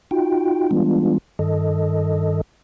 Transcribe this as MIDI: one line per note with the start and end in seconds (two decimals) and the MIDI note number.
0.11 0.71 63
0.11 0.71 65
0.11 0.71 66
0.11 0.71 79
0.71 1.18 52
0.71 1.18 55
0.71 1.18 56
0.71 1.18 59
0.71 1.18 62
0.71 1.18 65
1.39 2.41 43
1.39 2.41 51
1.39 2.41 69
1.39 2.41 75